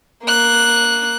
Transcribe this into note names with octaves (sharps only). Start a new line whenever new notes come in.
A#3 F#6